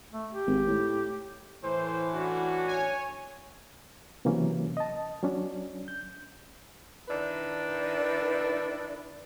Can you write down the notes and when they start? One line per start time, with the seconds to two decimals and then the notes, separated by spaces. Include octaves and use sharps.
0.13 A3
0.30 G4
0.47 G#1
0.67 A2
1.64 A2 E3 C5
2.14 C#4 D4 F#4
2.67 C#5 G#5
4.25 C3 E3 F#3 A#3 C#4
4.77 D#5 A5
5.23 F#3 C#4 D4
5.88 G6
7.09 D#3 D4 E4 B4